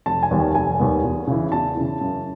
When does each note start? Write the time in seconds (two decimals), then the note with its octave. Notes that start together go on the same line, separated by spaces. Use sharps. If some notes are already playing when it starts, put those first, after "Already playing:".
0.06 F1 A5
0.23 G#5
0.31 D#2 D#3 G3 B3
0.39 G#5
0.55 F1 G#5
0.79 D#2 D#3 G3 B3
1.04 E2
1.27 C#3 E3
1.52 E2 A5
1.77 C#3 E3
2.01 F#2